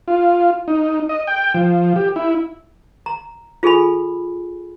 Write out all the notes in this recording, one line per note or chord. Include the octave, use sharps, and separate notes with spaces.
F4
D#4
D#5
G5
F3
G4
E4
A#5
F4 G#4 A4 G#5 B5